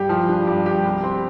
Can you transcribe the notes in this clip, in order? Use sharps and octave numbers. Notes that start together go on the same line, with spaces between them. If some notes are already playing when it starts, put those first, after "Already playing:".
Already playing: G2 G4
F3
D4
G2
G4
C2
C4